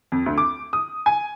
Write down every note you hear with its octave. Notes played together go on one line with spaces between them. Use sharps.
F2
D2
D6
D#6
G#5